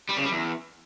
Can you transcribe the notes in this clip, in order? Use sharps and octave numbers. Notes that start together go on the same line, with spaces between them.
G3
C#3
G3
E2